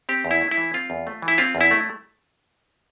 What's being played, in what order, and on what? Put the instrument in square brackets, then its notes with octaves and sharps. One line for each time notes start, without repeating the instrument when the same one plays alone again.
[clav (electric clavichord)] C4 G4
E2
E4
A3
E4
E3
C4 F4
E2
A3
E3
E4
C4 F4
E2
E4
A3